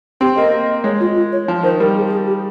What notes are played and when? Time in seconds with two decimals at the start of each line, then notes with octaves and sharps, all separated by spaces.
0.21 C4 G4
0.36 A#3 D#5
0.84 G#3 C#5
1.00 F4
1.16 F4
1.32 C#5
1.48 F3
1.63 D#3 C5
1.80 G3 A#4
1.96 G#4
2.05 G4
2.11 G#4
2.27 G4